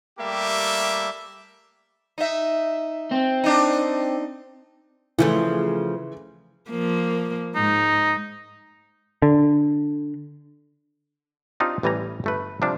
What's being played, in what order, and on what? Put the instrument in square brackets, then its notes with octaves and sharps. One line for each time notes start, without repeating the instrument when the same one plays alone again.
[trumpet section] G3 A3 A#3 G4 E5
[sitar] D#4 E5
[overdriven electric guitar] C4
[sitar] D4 D#4
[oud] C#3 F3 A3 [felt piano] E3
[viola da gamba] F3 A#3
[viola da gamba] G#2 [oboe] D#4
[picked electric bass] D3
[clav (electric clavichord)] C4 D4 D#4 F4 G4
A1 E3 G3 G#5 A#5
G1 A3 B4
C3 F3 G3 D4